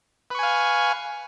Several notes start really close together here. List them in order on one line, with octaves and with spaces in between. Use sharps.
B4 C#6 G#5 F5